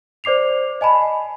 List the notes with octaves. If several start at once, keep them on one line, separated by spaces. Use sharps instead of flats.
C5 D5 D6 C7 F7
D#5 G#5 A5 B5